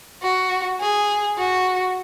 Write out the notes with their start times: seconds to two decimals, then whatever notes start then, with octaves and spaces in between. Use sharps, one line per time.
0.23 F#4
0.81 G#4
1.39 F#4